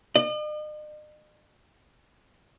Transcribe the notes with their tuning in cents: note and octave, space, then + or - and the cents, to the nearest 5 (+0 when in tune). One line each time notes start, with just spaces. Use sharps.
D#5 -45